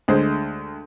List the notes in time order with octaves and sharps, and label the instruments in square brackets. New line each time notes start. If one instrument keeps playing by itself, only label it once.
[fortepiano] D2 G#3 C5